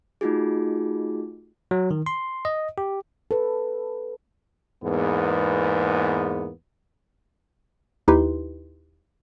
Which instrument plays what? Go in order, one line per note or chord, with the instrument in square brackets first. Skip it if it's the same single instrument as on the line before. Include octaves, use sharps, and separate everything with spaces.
[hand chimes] A3 D#4 F4 F#4 G#4
[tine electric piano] F#3
D#3
C6
D#5
G4
[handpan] A4 B4
[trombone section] E2 G#2 A#3 B3
[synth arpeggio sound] D#2 D#4 E4 G4 B4 C6